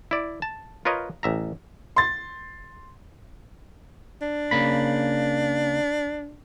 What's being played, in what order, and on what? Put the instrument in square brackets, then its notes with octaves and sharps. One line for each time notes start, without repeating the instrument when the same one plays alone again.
[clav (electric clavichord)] E4 D5
A5
F4 A#4 B4 C#5 D#5
A1 E5 A#5
[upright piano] C6 A6
[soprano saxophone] D4
[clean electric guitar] C#3 A#3 B5